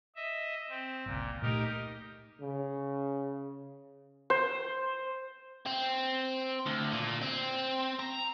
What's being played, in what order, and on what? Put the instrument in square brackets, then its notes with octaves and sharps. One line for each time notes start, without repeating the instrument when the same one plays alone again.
[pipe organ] D#5 E5
C4
[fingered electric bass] G1 C#2 [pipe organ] A#2
[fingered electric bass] A#2 A3 [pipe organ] D#4 G4 A#4
[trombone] C#3
[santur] C5
[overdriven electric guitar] C4
D2
A#2
C4
A#5